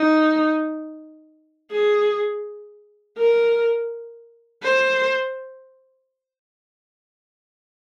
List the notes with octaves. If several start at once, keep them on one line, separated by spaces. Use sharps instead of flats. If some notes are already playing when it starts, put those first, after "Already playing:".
Already playing: D#4
G#4
A#4
C5